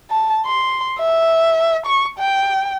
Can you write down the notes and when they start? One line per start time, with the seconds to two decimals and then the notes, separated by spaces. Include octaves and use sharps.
0.10 A5
0.46 C6
0.98 E5
1.86 C#6
2.18 G5